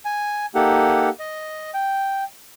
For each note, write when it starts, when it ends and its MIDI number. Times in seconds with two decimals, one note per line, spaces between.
0.05 0.46 80
0.55 1.09 58
0.55 1.09 63
0.55 1.09 67
0.55 1.09 69
0.55 1.09 78
1.19 1.70 75
1.74 2.24 79